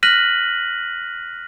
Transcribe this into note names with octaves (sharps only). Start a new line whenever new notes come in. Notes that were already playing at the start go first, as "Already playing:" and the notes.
F6 F#6 A#6 B6 D#7 F#7